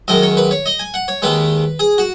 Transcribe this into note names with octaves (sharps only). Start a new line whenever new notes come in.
F#2 D#3 G#3 D#5
C#5
B4
C#5
D#5
G#5
F#5
C#5
D#2 D#3 G#3 B4
G#4
F#4